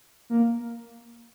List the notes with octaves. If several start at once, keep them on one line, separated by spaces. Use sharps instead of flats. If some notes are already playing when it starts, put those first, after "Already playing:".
A#3